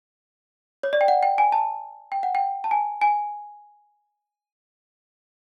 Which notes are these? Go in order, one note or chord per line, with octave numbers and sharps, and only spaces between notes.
C#5
D5
G5
F#5
G5
G#5
A5
G5
F#5
G5
A5
G#5
G#5